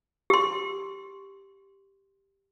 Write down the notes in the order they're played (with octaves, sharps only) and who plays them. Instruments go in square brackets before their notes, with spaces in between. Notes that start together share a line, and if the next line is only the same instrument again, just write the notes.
[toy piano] G4 C6